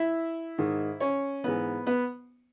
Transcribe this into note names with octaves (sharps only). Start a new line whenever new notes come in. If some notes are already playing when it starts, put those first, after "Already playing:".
Already playing: E4 E5
G#2 D#3
C#4 C#5
G#2 E3 B3 B4
B3 B4